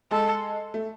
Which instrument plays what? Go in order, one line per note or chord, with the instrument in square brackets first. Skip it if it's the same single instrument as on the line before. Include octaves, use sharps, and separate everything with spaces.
[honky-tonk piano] G#3 [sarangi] A4
[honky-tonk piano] A3